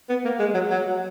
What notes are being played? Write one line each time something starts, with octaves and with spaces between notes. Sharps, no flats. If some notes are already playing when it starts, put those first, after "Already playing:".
B3
A#3
G#3
F#3
F#3